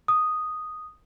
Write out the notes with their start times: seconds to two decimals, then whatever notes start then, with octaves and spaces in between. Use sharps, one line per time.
0.08 D#6